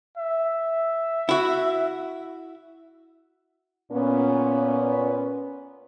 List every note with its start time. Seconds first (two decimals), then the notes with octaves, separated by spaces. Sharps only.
0.18 E5
1.29 E4 F#4
3.92 A#2 B3 C#4